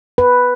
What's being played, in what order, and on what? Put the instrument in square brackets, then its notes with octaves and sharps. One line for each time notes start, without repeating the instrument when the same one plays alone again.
[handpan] B4